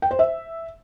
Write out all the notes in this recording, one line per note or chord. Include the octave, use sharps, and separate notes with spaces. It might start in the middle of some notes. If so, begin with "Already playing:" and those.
G5
C5
E5